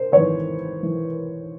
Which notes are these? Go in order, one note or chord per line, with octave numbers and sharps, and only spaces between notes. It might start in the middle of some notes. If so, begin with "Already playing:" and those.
Already playing: A#4 C5
G#1 G#2 E3 B4 C#5
E3